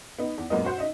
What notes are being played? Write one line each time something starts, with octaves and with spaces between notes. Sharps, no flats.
B3 D#4
E2
F#2 A#2 G#3 B3 A#4 D#5
F#4 C5 F#5
D#4 D#5 E5